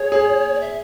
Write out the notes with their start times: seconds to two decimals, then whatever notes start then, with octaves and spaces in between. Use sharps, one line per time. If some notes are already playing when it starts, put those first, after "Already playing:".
Already playing: G#4 C#5
0.12 G#4
0.54 D5
0.61 E5